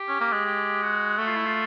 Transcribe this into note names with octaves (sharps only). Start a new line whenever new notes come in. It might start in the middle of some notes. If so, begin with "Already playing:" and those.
Already playing: G4
C#4
A#3
G#3
G4
F#4
A3 F#4
F4
E4
F4